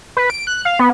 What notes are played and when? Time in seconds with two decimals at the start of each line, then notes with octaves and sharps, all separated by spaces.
0.17 B4
0.30 D7
0.47 F#6
0.65 F5
0.79 B3